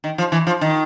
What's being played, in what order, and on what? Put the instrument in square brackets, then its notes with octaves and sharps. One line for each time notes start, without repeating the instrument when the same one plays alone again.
[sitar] D#3
F3
E3
F3
D#3